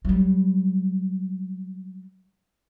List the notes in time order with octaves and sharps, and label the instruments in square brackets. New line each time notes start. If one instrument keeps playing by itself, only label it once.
[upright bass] F#3 G3